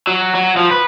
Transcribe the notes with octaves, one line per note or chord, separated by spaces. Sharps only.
F#3
F#3
F3
B4